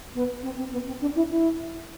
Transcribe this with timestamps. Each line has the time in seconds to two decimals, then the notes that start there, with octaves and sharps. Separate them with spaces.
0.14 B3
0.43 C4
0.58 C4
0.72 B3
0.87 C4
1.01 D4
1.15 E4
1.30 E4